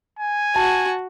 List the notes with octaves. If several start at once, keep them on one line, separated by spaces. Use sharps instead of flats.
G#5
F#4 A5